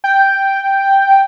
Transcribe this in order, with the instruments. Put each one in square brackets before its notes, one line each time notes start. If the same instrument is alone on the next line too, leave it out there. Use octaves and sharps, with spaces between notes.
[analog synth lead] G5